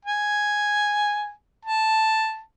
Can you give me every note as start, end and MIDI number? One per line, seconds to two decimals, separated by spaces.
0.05 1.31 80
1.65 2.40 81